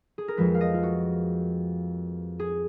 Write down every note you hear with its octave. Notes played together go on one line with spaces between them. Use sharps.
G#4
A#4
F2 F3 G#3 B4
F5
D#5
F4
F#4
G#4